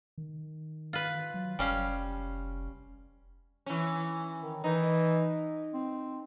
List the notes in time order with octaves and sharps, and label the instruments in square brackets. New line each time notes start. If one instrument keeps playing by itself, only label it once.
[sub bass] D#3
[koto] F4 B4
[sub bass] F#3
[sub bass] F1 [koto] G3 C#4 F5
[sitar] E3 C#4
[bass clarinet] D#3
[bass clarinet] E3 [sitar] D#4
[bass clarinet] C4